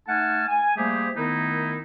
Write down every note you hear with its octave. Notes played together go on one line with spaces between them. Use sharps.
A3 D#4 F#5 G#5 A5 F6
G#5
G3 A3 A#3 G4 G#4 C5
D#3 A3 B3 D#4 E4 A#4